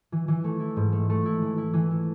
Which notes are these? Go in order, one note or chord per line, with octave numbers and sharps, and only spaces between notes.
E3
E3
A3
E4
G#2
A3
A3
E4
E3
E4
E3
A3